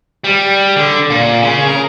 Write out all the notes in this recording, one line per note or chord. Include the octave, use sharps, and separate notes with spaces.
G3
D3
A#2
C#3
A#4